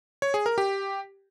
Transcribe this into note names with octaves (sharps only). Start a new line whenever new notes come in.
C#5
G#4
A#4
G4